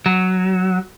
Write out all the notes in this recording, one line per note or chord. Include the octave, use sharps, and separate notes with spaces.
F#3